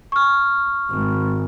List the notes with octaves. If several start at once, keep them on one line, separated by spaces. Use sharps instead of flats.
C#6 F6
G#1